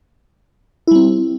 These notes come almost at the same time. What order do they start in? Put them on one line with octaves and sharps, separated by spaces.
E4 G3 C4